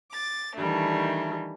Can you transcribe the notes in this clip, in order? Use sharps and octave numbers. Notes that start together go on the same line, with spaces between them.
D6 A6
D#3 E3 G3 A3 D4